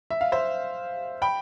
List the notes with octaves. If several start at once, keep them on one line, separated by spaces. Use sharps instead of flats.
E5
F5
C5 E5
G5 B5